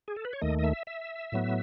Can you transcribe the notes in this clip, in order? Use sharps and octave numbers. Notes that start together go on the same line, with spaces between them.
G#4
A4
B4
C#5
D#2 D#3 A3 D#5
D#5
E5
E5
A2 F#3 B3